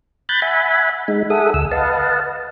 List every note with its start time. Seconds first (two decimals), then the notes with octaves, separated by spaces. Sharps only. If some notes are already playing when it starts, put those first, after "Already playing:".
0.29 B5 F#6 G6 A6
0.42 E5 F#5 G#5 B5
1.08 G#3 D#4
1.30 G#4 A4 E5 F#5 D#6
1.54 D2 E6
1.71 B4 D#5 F5 F#5 A5